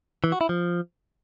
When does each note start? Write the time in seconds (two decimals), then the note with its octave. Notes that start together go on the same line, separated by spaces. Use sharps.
0.24 E3
0.32 F#4
0.41 E4
0.49 F3